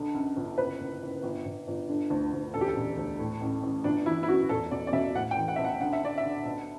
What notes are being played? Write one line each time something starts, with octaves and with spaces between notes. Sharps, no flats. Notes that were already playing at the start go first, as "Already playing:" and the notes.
Already playing: B1 D3
F#2
G1
F#1 B4
F#1
F#1
G1
G1
G1
D3
D2
D2
E1 A4
G4
A4
E1
D2
A2
A1
A1
G1 D4
E3 E4
E4
F#2 F#4
E1 A4
B2 D5
D5
B2 E5
A2 F#5
G5
E3
F#5
B1 E5
F#5
D3 F#5
E5
D3 D5
E5
D3
B1